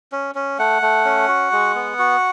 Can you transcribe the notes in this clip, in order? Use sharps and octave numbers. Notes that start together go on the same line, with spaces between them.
C#4
C#4
A3 F#5
A3
C#4
F#4
G#3
B3
F#4